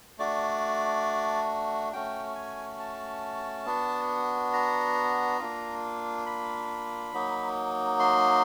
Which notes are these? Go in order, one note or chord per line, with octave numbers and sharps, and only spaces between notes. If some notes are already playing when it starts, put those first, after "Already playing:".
A3 D4 F#4 D5
A3 C#4 F#4 G5
G#5
A5
B3 D4 F#4
A#5
A#3 D4 F4
B5
F#3 A#3 D#4
C6